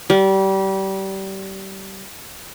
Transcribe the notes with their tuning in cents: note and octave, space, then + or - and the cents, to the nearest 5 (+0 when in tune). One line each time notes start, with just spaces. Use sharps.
G3 -25